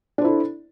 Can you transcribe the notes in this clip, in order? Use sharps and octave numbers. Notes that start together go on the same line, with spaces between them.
D4 E4 A4 C5